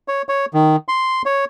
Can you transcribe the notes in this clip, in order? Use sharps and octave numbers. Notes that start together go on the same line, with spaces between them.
C#5
C#5
D#3
C6
C#5